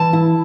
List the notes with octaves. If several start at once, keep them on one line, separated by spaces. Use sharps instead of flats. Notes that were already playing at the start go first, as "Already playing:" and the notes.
Already playing: E3 A5
E4